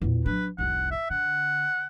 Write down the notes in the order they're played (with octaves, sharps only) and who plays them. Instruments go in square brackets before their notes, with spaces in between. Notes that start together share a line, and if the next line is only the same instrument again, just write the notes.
[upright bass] E2 A#2
[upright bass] F#3 D4 [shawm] B4
[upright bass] F1 C2 [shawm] F#5
[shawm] E5
[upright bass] D3 [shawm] F#5